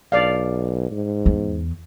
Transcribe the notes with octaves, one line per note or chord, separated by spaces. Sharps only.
B1 D5 F5
G#2
E2